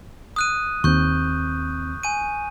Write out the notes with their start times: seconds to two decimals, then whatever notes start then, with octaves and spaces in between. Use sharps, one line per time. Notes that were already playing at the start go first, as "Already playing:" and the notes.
0.36 D#6 F#6 D#7
0.84 D#2 C4 C#6 G6
2.03 G#5 D#7